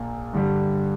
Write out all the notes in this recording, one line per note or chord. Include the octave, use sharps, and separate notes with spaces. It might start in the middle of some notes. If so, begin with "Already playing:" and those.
Already playing: A#1 A#2 A#3
G2 D3 G3